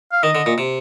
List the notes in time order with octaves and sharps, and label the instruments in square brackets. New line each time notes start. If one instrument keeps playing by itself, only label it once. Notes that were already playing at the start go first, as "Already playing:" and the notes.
[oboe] F5
[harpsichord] D#3 [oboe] D#5
[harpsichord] D3
A#2
C3